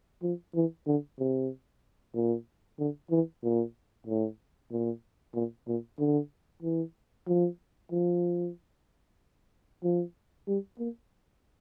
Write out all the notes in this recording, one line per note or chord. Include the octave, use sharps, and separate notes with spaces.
F3
E3
D3
C3
A#2
D3
E3
A#2
A2
A#2
A#2
A#2
D3
E3
F3
F3
F3
G3
A#3